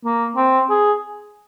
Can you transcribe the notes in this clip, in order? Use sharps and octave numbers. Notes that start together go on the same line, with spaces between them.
A#3
C4
G#4